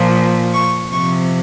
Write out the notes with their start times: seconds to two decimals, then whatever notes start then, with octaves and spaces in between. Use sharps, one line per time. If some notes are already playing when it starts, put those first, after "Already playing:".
Already playing: A#2 F3
0.53 C#6
0.91 C3 F3 C#6